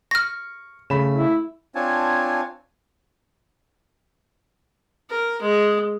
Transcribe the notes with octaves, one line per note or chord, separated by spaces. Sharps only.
C#6 F6 A#6
C#3 A3 B5 E7
E4
C4 D4 F4 C#5 G#5 A5
A#4
G#3